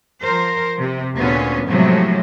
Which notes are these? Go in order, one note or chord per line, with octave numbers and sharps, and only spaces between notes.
F3 A#4 C5
C3
D2 A#2 D3 B3 C#4
A2 C3 F3 F#3 G#3 A3